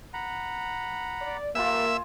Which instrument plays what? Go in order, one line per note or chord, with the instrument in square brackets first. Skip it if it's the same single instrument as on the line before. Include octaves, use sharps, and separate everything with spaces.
[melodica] F#5 A#5 B5
[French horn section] D5
[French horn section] A#3 [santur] F4 G#5 [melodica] G4 B4 [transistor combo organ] E5